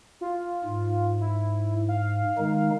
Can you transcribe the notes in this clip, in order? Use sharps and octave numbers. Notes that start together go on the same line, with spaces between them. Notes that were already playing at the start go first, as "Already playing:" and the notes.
F4
G#2
E4
F5
D#3 G#3 D#4